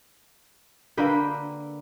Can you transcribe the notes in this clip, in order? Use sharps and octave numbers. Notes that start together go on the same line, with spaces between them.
D3 A#3 B4 G5